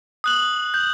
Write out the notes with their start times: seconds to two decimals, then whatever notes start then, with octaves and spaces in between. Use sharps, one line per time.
0.24 D#6 F#6 F#7
0.74 G6